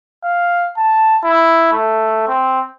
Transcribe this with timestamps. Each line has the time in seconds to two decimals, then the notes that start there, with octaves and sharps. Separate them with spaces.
0.24 F5
0.77 A5
1.24 E4
1.72 A3
2.28 C4